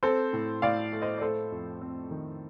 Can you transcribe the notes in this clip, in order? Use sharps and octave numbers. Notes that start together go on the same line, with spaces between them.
C4 A4 C5
A2
A2 D5 F5
A3
C5 D#5
D5
A3 A4 C5
F2
C4
D#3